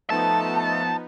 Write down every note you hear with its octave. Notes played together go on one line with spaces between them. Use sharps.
F3 A3 B3 D#4 A4 A5